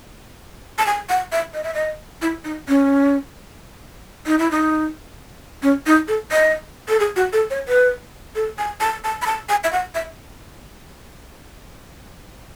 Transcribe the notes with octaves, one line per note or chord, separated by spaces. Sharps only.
A5
G#5
F#5
E5
D#5
E5
D#5
E4
D#4
C#4
D#4
E4
D#4
C#4
D#4
A4
D#5
A4
G#4
F#4
A4
C#5
B4
A4
G#5
A5
A5
B5
A5
G#5
E5
F#5
E5